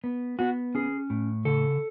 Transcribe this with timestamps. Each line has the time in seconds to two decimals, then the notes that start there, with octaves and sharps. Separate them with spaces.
0.04 B3
0.39 B3 F#4
0.75 C#4 G#4
1.10 A2
1.45 C#3 A4